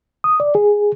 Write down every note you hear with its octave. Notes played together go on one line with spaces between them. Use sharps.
D#6
D5
G#4